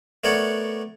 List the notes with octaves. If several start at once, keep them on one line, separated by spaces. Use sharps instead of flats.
A3 B3 A#4 C#5 D5 F#5